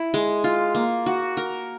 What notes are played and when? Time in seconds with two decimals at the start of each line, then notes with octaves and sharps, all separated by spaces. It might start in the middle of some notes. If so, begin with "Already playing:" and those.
Already playing: E4
0.14 G#3
0.44 F4
0.75 A#3
1.06 F#4
1.37 A#4